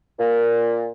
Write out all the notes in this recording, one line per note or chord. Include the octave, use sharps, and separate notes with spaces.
A#2